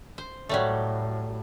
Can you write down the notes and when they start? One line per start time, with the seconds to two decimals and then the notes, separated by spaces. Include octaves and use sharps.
0.18 C5
0.49 A2 F#3 G3 A3